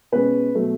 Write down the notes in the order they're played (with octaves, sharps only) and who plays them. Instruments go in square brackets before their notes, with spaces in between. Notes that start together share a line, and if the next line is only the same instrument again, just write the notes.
[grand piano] B2 G#3 C#4 B4
B2 F#3 A3